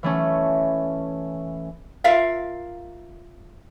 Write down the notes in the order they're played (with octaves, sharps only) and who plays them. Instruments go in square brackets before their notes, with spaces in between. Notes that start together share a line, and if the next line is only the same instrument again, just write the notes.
[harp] E3 A3 C#4
[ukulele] F4 A#4 E5 F5